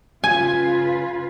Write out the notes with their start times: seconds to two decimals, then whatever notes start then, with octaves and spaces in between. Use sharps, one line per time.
0.24 C#3 F4 B4 G#5